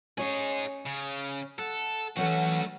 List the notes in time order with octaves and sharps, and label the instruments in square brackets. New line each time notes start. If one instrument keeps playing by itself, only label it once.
[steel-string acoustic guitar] C#4 C#5 [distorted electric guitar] D#4 G#4
[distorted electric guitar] C#3
[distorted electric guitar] A4 [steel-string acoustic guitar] F#5
[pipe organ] E3 F#5 [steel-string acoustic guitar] F#3 C#4 A4 [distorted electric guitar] A3 F#4